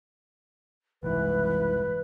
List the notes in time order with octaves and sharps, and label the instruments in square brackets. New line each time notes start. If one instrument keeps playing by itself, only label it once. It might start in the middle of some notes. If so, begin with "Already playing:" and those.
[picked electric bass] F#1 C2 G#2 [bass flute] E3 [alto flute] B4